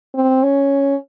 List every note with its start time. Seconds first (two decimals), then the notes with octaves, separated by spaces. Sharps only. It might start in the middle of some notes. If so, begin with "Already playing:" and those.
0.15 C4
0.43 C#4